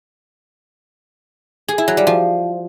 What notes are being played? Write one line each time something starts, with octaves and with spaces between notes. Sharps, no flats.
G#4
E4
F#3
G3
F3